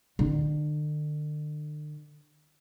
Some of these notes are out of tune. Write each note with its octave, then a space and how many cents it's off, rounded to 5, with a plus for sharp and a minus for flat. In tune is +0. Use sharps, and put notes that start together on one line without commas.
D3 +40